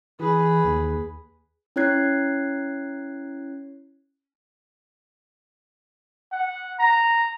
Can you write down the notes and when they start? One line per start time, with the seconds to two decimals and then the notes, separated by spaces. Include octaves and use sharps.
0.19 E3 G#4 B4
0.64 D#2
1.76 C#4 E4 C#5 F#6 G#6 C7
6.32 F#5
6.79 A#5